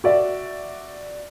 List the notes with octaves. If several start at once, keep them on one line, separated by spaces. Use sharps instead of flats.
F#4 D5 E5